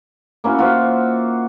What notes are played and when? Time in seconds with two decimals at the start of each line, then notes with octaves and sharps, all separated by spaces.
0.44 A#3 C#4 E4 F#4
0.59 F4 F#4 C5 E5